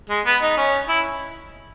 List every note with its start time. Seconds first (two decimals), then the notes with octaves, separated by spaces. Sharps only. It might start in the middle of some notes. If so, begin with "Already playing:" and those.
0.09 G#3
0.26 B3
0.42 D#4
0.57 C#4
0.88 E4